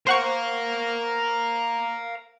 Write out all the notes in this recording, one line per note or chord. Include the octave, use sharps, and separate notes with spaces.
A#4 C5 F5 F#5 C#6